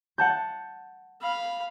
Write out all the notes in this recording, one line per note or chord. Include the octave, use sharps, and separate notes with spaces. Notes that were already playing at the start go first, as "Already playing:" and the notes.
F#5 A5 G6
F5 B5